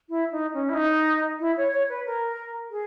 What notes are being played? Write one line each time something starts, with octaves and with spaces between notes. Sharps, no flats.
E4
D#4
C#4
E4
D#4
E4
C#5
C#5
B4
A#4
G#4